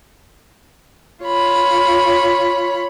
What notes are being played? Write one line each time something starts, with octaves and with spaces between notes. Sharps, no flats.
F4 C#5 B5